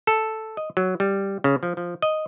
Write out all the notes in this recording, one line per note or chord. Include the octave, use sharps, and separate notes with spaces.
A4
D#5
F#3
G3
C#3
F3
F3
D#5